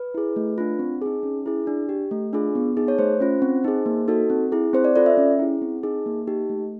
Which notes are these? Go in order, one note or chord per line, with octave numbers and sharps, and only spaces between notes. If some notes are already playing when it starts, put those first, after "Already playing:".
Already playing: B4
E4 G#4
A3
D4 F4
C4
D#4 G#4
C#4
E4 G#4
D4
G4
A3
D4 F4 G#4
B3
D#4 G#4
C#5
A3 C5
C#4 F4
C4
D#4 G#4
A#3
D#4 F#4 A4
C4
E4 G#4
C4 C5
D5
F4 A4 D5
E5
C#4
E4 G#4
C4
D#4 G#4
A#3
D#4 G4
A3